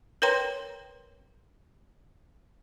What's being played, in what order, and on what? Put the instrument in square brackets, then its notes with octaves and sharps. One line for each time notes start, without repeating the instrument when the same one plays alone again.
[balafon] A#4 B4 C#5 G5 A#5 C6